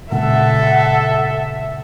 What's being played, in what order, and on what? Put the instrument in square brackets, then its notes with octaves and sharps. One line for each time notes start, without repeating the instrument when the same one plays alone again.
[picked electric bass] A#2 C#3 G#3 [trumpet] A4 [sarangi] E5 [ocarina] F#5